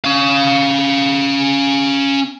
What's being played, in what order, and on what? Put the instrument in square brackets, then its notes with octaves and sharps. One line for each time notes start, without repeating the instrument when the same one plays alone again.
[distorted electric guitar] C#4 F5